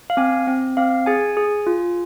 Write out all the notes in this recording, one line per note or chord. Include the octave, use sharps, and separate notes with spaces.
F5
C4 G#5
C4
C4 F5
G#4 G#5
G#4
F4